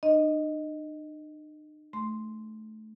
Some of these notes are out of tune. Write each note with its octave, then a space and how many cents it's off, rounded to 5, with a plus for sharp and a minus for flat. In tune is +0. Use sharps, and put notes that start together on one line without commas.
D#4 -45 D#5 +0
A3 -20 C6 +0